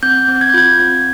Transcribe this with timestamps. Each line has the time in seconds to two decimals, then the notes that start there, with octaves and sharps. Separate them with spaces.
0.03 C4 G6
0.28 C4
0.41 G#6
0.50 G6
0.54 F4 G#6
0.79 C4